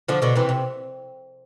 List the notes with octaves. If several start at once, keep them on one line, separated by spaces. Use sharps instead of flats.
D3 F3
B2 D3
C3 E3
C3